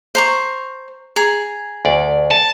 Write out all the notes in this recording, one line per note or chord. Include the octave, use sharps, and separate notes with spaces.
C5 A#5 C#6
G#4 A#5
D2 D5
A5